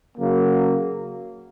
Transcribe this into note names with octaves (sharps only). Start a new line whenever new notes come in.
C#3 F#3 A#3